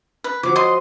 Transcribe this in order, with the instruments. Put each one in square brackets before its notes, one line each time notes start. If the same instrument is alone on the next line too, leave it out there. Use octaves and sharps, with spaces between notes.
[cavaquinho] B4
[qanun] F3 F#3 [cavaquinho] D6
[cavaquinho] D#5 C6